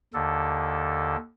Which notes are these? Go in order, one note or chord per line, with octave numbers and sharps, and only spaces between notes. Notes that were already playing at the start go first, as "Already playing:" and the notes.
D#2 D3 A4